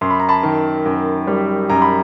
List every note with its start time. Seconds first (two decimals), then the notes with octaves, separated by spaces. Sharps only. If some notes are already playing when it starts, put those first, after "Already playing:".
0.01 F#2 C6
0.10 B5
0.20 A#5
0.29 A5 B5
0.43 D#3
0.86 F#2
1.27 G3
1.70 F#2 A#5
1.82 B5